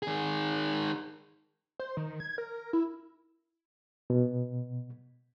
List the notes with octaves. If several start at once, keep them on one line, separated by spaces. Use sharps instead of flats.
D#3 G#4
C5
D#3
G#6
A#4
E4
B2